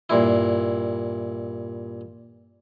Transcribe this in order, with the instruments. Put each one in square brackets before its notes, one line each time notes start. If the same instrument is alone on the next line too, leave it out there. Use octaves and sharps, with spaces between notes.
[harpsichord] G2 A#2 E4